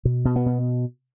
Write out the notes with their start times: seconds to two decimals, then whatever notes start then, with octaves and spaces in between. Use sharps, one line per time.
0.05 B2
0.25 B2
0.36 B3
0.46 B2